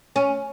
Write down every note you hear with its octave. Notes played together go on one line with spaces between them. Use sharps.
C#4